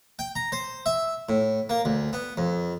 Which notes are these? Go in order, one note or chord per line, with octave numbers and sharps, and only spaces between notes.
G5
A#5
C5
E5
A2
A#3
D2
B3
F2